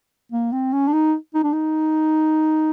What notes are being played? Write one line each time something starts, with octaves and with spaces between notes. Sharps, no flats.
A#3
C4
C#4
D4
D#4
D#4
D4
D#4